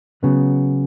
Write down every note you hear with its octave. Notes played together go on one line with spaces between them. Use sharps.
C#3 F#3 B3